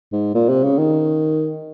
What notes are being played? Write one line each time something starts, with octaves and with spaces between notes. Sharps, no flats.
G#2
A#2
C3
C#3
D#3